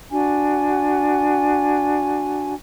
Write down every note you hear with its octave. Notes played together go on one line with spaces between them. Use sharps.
D4 F#4 G#5